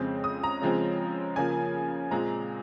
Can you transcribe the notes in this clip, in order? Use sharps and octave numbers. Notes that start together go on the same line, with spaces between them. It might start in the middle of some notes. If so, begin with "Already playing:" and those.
Already playing: F2 C#3 G#3 C4 G6
D#6
A#5
C#3 F3 G#3 C4
C#3 F3 A#3 G#5
A#2 G#3 C4 A#5